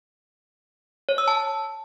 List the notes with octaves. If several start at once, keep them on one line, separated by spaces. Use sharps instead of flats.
C#5
E6
A5